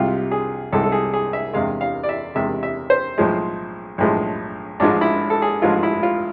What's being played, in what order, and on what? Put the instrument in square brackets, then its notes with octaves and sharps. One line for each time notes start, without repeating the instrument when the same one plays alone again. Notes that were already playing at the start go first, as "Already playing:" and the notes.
Already playing: [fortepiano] C2 C3 G#3 F4
G#4
C2 C3 G#3 A4
A4
G#4
G#4
E5
E2 C3 G#3 F5
F5
D5
E5
E2 C3 G#3 E5
E5
C5
B1 A2 F3 G#3
B1 A2 F3 G#3
A1 G#2 F3 G#3 D4
E4
A4
G#4
A1 G#2 F3 G#3 F4
E4
F4